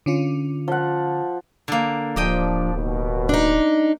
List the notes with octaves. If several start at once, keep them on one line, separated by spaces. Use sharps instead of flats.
D3 C#4 F4
F3 F#5
D3 A#3
D1 F3 D4 G4 D#5 G5
D#2 B2
D4 D#4